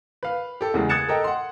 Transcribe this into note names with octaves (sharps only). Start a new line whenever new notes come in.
B4 F5
G4 A4
E2 C#3 G#3
D#6 F#6 G#6 A6 C#7 E7
A4 A#4 D#5 G5
F#5 C6